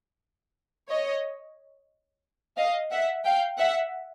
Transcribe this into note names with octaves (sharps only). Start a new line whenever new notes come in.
C#5 D#5
D#5 F5
E5 F#5
F5 G5
E5 F#5